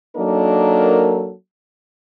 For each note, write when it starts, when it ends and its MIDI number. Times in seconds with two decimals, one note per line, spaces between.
0.16 1.32 54
0.16 1.32 58
0.16 1.32 62
0.16 1.32 63
0.16 1.32 69
0.16 1.32 70